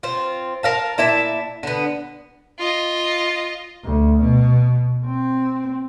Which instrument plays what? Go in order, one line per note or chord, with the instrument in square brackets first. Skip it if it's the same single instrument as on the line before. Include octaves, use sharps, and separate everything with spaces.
[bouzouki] C4 F4
A#4 F5 A5
A#2 E4 E5 A5
D3 B3
[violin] F4 D#5
[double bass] D2
B2
C4